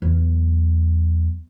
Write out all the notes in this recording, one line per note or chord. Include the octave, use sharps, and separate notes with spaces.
E2 F#3